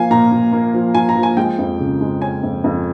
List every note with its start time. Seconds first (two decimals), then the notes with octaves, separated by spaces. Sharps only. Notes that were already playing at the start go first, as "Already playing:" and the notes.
Already playing: F3 A#3 F5 G#5
0.11 A#2 A#5
0.31 A#2
0.53 A#3
0.74 F3
0.94 F3 G#5
1.09 A#5
1.17 F3
1.23 G#5
1.37 G#3 G5
1.59 F2
1.79 C#3
2.01 G#3
2.22 C#4 G#5
2.43 F2
2.64 F2